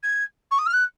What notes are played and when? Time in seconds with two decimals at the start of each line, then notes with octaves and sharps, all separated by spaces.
0.03 G#6
0.51 C#6
0.58 D#6
0.66 F6
0.73 F#6